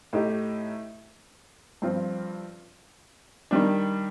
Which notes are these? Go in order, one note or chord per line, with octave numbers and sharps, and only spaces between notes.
A2 A3 D#4 G4
G2 F3 C4 F4
D#3 G3 D4